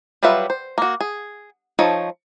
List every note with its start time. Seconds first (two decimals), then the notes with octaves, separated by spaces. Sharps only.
0.23 F#3 G3 F4 B4 E5
0.50 C5
0.78 A#3 F#4
1.00 G#4
1.79 F3 D#4 A4 C#5